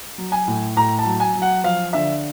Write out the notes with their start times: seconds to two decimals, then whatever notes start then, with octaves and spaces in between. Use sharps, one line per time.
0.18 F#3
0.32 G#5
0.47 A2
0.76 A2 A#5
0.99 A5
1.05 F#3
1.20 G#5
1.35 F#3
1.42 F#5
1.64 F3 F5
1.93 D3 E5